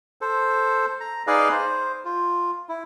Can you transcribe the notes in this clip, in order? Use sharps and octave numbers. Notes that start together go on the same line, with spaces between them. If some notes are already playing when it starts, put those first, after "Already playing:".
A4 C5
A#5
D#4 G#4 B4 D5 D#5 F5
C5
F4
E4